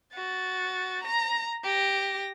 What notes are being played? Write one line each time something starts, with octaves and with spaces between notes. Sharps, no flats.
F#4 A6
A#5 A#6
G4 A#6